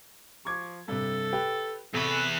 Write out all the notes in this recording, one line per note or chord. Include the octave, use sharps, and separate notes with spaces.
F3 C#6 D6 G#6
G2 C3 A4
G4 B4 G5
E2 C3 A4 B4 C#6